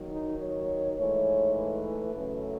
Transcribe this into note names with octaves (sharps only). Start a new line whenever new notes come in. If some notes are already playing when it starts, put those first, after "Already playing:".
Already playing: D#2 D#3 F#3
D#4
C#5
G#2 E3 A3 C#5
B4
F#2 C#3 F#3 A3